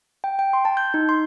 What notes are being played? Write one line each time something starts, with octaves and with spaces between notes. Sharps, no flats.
G5
G5
C6
A5
G6
D#4
C6